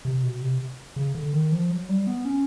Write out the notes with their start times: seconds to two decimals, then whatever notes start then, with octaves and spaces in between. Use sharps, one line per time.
0.05 C3
0.23 B2
0.42 C3
0.96 C#3
1.15 D3
1.33 D#3
1.52 F3
1.70 F#3
1.89 G3
2.07 B3
2.25 C#4